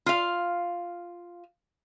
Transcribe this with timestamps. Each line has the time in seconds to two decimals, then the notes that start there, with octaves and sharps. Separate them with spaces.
0.06 F4 F5